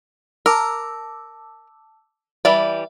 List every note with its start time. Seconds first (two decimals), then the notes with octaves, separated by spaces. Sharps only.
0.46 A#4 A5 D6 E6
2.45 E3 G3 D5 E5